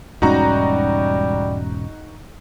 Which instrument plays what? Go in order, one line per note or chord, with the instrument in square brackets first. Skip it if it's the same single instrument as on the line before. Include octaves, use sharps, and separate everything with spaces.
[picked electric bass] E1 G#2 C#4 [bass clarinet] G3 [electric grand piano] D#4 F#4 A#5